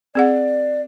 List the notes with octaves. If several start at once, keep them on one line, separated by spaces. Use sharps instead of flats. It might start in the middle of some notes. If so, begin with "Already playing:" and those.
C4 G#4 D5 F#5